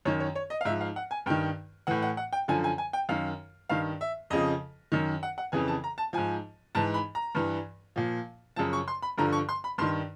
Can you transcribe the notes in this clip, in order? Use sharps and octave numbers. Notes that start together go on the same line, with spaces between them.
F#2 D#3 C#5
C#5
C#5
D#5
F5
G#2 F3 E5
F5
F#5
G#5
G2 D#3 G5
A2 E3 F#5
F#5
F#5
G5
F#2 D3 F3 G#5
G#5
G#5
G5
F#2 D#3 F5
G2 D#3 F5
E5
F2 C#3 F3 D#5
F#2 D#3
F#5
F#5
F2 C#3 E3 G#5
A5
A#5
A5
G#2 F3 G#5
G#2 E3 A5
B5
A#5
G2 E3
A#2 F3
F#2 C#3 F3 A5
C#6
C6
B5
G2 D3 F3 A#5
C#6
C6
B5
G2 D#3 C6